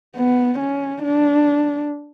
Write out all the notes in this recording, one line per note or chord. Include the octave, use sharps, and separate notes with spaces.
B3
C#4
D4